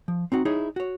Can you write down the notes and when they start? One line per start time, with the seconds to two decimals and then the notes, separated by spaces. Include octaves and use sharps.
0.08 F3
0.32 C4 D#4 F#4
0.45 D#4 E4 G#4 C#5
0.76 F#4 C#5